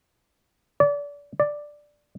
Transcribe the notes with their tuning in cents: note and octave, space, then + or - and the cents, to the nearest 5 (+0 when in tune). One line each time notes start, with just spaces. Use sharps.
D5 -30
D5 +5